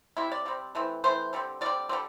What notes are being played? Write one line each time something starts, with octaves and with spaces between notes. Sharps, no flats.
C3 G3 C4 E4
D5
C3 G3 C4
E3 A3 C4
E3 A3 C4 C5
D3 G3 C4
D3 G3 C4 D5
D3 G3 C4